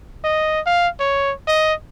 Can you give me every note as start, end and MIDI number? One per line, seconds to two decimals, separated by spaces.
0.24 0.60 75
0.66 0.88 77
1.00 1.32 73
1.47 1.74 75